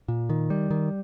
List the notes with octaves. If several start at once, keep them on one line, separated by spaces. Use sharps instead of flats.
A#2
D#3
G3
D#3